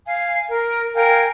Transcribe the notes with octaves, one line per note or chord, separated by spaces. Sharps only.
F5 G#5
A#4
A#4 F5 G5 G#5